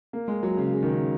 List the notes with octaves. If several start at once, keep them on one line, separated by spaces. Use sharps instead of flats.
A#3
G#3
F#3
C#3
C#3
D#3
C#3